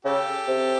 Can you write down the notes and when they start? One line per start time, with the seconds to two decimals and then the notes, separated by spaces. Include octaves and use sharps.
0.05 C#3 G4 A4
0.48 C3